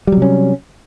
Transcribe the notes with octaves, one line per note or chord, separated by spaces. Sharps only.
C3 F#3 G3 C#4